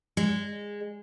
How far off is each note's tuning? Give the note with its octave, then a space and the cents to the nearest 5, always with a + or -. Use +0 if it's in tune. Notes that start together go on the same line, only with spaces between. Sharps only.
G#3 -15